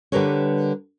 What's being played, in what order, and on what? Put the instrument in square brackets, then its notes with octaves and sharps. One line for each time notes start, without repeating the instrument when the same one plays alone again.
[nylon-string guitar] D3 G3 G4 A#4 B4 C#5